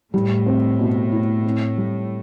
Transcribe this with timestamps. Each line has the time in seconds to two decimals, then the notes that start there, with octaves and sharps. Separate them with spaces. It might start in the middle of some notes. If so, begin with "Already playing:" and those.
0.13 A2 G3
0.46 C4
0.79 B2
1.12 E4
1.44 C4
1.78 G3